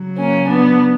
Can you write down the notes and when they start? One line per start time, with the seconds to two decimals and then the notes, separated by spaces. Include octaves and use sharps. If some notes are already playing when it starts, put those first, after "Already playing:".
Already playing: C#3 F#3
0.17 A#3 C#4
0.47 B3 D4